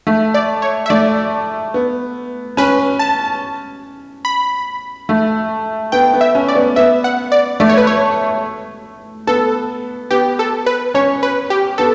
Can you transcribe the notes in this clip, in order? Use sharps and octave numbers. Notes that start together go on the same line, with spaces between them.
A3
D5
C#5
E5
A3 D5
B3
C#4 B4
A5
B5
A3
B3 G5
B3
E5
C#4
D5
B3
B3 E5
F#5
D5
A3 D5
C#5
B4
C#5
B3 A4
B3 G4
A4
B4
C#4 C#5
B4
G4
B3 A4